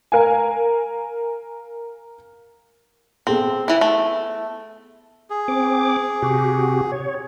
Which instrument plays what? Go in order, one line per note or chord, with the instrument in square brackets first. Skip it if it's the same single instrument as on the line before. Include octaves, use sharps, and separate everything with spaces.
[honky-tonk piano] A#4 F5 G#5
[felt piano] B3 G#4 A4 [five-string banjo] C4
[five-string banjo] E3 E4
A3
[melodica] G#4
[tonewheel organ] C4 D6
C3 F#4 G4
C#5